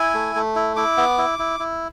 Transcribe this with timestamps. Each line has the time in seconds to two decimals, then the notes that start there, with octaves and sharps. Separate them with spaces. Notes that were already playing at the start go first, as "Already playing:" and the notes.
Already playing: E4 G#5
0.14 A3
0.36 A3
0.56 E4
0.76 E4 D6
0.97 B3
1.18 E4
1.39 E4
1.60 E4